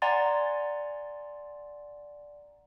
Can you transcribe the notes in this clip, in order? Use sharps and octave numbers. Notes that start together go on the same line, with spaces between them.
D5 F#5 G#5 A#5 C6 A6